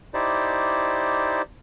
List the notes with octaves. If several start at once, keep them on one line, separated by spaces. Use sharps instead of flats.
D#4 E4 G4 C5 D5